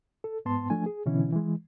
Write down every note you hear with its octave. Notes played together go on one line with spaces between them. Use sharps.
A4
G#2 B3 A5 C6
F3 A3 D4 G#5
G#4
B2 D3 E3 C#4 E4
E3 G#3